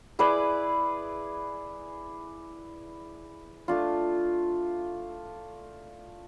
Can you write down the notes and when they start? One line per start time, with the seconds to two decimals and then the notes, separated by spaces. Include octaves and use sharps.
0.19 E4 G#4 B4 D5
3.68 A3 D4 F4